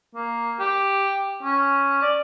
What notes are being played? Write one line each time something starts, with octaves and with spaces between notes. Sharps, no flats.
A#3
G4
C#4
D5